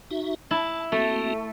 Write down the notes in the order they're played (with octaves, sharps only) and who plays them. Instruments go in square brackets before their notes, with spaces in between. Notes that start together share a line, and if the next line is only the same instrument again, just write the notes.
[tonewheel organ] D#4 F#4 E5
[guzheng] E4 [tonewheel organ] A5
[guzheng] A3 [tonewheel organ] A#3 C4 F#4